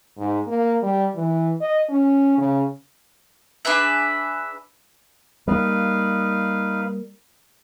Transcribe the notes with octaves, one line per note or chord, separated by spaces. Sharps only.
G#2
A#3
G3
E3
D#5
C#4
C#3
D4 G#4 B4 E5
G3 A#3 D#4 B4 F5